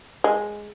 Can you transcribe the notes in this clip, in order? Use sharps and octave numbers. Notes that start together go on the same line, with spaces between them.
G#3